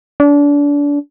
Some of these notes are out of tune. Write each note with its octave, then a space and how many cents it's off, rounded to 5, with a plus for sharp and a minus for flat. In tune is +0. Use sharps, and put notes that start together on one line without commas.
D4 -30